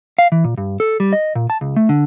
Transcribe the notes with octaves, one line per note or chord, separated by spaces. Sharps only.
F5
E3
A#2
G2
A4
G3
D#5
A#2
A5
C#2
A3
D3